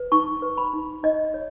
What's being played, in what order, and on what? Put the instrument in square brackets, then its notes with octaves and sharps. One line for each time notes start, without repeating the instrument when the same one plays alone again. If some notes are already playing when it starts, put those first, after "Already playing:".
Already playing: [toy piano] B4
D#4 C#6
B4
B5
D#4
D#4 D#5
C#5